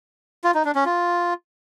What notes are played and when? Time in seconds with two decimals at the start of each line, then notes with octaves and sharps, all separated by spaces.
0.44 F4
0.55 D#4
0.65 D4
0.75 C#4
0.86 F4